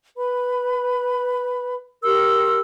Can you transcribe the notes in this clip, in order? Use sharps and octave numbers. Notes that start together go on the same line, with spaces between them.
B4 B5
G4 A#4 C6 E6